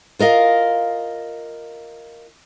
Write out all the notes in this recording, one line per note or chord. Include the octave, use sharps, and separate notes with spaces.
F4 A#4 D#5 F5